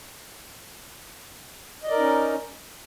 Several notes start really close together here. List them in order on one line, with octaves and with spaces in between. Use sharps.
D#5 D5 A#4 D#4 C#4